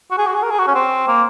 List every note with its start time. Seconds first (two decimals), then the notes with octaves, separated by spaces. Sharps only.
0.11 F#4
0.18 G#4
0.27 F#4
0.34 G#4
0.43 A#4
0.50 G#4
0.59 F#4
0.67 C#4
0.74 C4
1.08 A#3